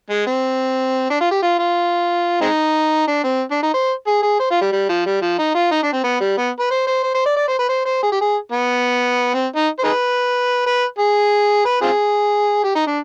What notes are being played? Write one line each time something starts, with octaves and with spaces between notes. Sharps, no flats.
G#3
C4
D4
F4
G4
F4
F4
G#3 C4 D#4
D4
C4
D4
D#4
C5
G#4
G#4
C5
F4
G3
G3
F3
G3
F3
D#4
F4
D#4
D4
C4
B3
G3
B3
B4
C5
C5
C5
C5
D5
D5
C5
B4
C5
C5
G#4
G4
G#4
B3
C4
D#4
C5
D#4 G#4 B4
B4
G#4
B4
C4 F4 G#4
G4
D#4
D4